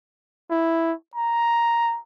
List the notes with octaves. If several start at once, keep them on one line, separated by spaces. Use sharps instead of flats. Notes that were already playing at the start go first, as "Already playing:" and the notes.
E4
A#5